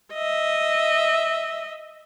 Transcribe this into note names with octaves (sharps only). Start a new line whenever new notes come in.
D#5 E5